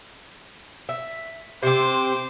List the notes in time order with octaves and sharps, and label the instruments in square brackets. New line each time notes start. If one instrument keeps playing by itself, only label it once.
[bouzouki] E5
[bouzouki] C3 C4 [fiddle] C5 D6